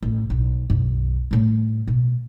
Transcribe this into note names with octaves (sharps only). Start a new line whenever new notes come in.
A1
B1
B1 F#2
A2 G3
B2